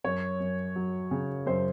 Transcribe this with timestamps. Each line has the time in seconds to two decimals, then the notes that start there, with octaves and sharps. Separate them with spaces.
0.04 F#2 C#5
0.40 F#2
0.76 F#3
1.11 C#3
1.46 F#2 C5